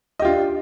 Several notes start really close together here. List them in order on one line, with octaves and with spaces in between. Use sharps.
D#5 G4 F4 D4